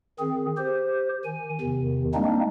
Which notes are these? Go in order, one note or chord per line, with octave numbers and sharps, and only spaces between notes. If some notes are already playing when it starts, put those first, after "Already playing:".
D#3 C4 G#4
G4 C5
D#3 G#5
E2 C3 D#3
G3 G#3 A#3 C4 D4 D#4